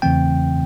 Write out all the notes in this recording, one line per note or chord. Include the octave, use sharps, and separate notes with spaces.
E2 C#3 E3 A3 C4 G5